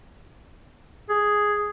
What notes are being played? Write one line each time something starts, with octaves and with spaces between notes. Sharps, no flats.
G#4